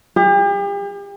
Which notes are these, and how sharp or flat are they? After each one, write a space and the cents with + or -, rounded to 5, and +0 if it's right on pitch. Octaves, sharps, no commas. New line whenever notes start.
G4 +40